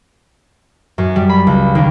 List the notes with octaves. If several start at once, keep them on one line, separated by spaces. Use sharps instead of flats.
F#2
G3
B5
C#2
D#2